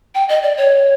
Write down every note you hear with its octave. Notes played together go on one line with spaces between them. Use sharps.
G5
D#5
D5
C#5